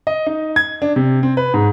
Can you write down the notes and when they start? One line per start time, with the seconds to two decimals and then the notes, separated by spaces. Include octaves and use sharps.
0.07 D#5
0.26 D#4
0.56 G#6
0.82 D4
0.96 C3
1.23 C4
1.37 B4
1.54 G#2